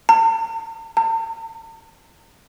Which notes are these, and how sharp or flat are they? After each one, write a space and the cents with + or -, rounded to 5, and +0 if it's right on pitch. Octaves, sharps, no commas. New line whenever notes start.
A5 +45
A5 +45